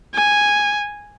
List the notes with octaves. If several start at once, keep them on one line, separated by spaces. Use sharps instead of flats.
G#5